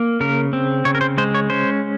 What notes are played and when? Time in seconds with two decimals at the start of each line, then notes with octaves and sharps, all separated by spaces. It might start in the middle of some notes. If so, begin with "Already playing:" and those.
Already playing: A#3
0.20 C#3 A#4
0.53 C4
0.85 C#3 C#5
0.95 A#4
1.01 C5
1.18 G#3 C5
1.35 C#5
1.50 C#4 C5